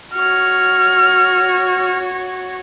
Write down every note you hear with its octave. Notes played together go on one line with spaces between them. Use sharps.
F#4 C#5 F6